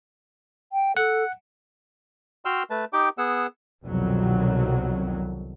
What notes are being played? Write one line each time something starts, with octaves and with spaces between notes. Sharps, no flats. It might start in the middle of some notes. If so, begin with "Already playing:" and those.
G5
A4 F#5
F#4 G5 C6 E6 F6
A3 B4 A5
D#4 G4 G5 D6
B3 G#4 F#5 E6
C2 F2 B2 D#3 F#3